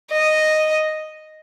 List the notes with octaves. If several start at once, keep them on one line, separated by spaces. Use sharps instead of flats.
D#5